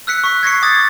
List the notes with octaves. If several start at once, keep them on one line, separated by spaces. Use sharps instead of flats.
E6 F#6 B6 C#7
C#6 B6
G#6 A#6 C7 C#7
D6 D#6 G#6 A6